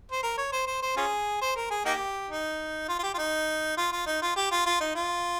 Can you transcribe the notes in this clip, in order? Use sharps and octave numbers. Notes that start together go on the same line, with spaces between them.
C5
A#4
C#5
C5
C5
C5
C#4 F4 G#4
C5
A#4
G#4
A#3 D#4 G4
D#4
F4
F4
G4
F4
D#4
F4
F4
D#4
F4
G4
F4
F4
D#4
F4